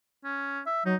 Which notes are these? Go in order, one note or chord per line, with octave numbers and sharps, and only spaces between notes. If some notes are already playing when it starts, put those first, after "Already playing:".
C#4
E5
F#3 D#4